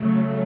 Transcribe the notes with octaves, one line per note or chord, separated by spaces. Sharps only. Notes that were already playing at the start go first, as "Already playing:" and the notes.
Already playing: C#3 F#3 A3